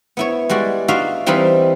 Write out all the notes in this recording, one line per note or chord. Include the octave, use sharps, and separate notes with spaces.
B3 E4 C#5
G3 G#3 F#4 D5
D#4 F4 F#4 D5 E5 F5
E3 G3 C4 D#4 F5 B5